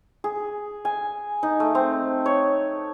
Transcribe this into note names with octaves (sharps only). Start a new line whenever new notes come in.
G#4
G#5
D#4
A3
C4
C#5